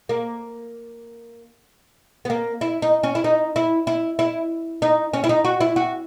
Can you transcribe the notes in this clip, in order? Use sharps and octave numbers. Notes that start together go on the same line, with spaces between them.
A#3
B3
A#3
E4
D#4
C#4
E4
D#4
E4
E4
E4
D#4
C#4
E4
D#4
F#4
E4
F#4